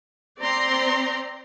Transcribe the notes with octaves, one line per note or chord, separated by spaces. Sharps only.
C4 D5 A#5 C6